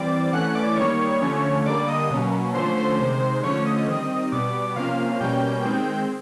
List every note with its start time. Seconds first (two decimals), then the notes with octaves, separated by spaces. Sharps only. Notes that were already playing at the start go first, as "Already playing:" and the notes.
Already playing: E3 G3 C4 D5 D6
0.33 E3 A3 C#4 F#5 F#6
0.55 D5 D6
0.77 D#3 G3 A#3 C#5 C#6
1.22 D3 F3 A3 C#4
1.66 D3 G3 A#3 D5 D6
1.88 D#5 D#6
2.11 B2 F#3 A#3 C#4
2.54 D3 F3 A3 C#4 C5 C6
2.77 C5 C6
2.99 C3 D#3 G#3
3.43 D3 F3 A3 C#4 C#5 C#6
3.66 D#5 D#6
3.88 D#3 G3 C4
4.32 B2 G3 B3 D5 D6
4.76 C3 F3 A#3 C#4 F5 F6
5.20 B2 G3 A#3 C#4 G5 G6
5.65 D#3 G#3 C4